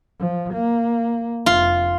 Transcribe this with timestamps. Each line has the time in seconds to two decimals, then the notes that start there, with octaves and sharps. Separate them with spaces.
0.20 F3
0.53 A#3
1.46 F1 F4